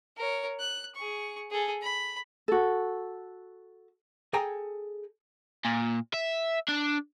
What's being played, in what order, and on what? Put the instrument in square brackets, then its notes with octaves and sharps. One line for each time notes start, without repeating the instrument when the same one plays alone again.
[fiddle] A#4 C#5
F#6
G#4 C#6
G#4 A4
B5
[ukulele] F#4 A4
[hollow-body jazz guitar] G#4 A4 G5 G#5 A#5
[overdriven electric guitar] A#2
E5
D4